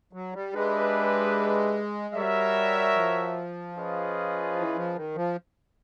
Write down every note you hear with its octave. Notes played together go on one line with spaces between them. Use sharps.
F#3
G3
G#3 D4 G4 B4 E5
G3 F#4 A#4 C#5 E5
F3
C#4 F4 G#4 B4 D#5
E3
F3
D#3
F3